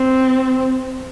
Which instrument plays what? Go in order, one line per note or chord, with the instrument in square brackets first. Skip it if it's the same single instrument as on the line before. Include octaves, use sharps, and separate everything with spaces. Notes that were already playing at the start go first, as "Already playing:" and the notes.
Already playing: [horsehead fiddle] C4